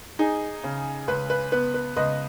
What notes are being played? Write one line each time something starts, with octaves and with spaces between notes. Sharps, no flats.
D#4 G#4
C#3
C#2 B4
B4
B3 B4
B4
C#2 B4 D#5